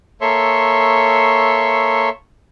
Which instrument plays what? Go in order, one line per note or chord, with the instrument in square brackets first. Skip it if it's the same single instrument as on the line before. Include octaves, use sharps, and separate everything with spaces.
[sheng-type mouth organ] A#3 A4 C#5 E5 C6 C#6